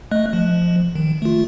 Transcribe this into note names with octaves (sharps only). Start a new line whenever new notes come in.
A3 D#5 F#6
F3
D#3
A3 F4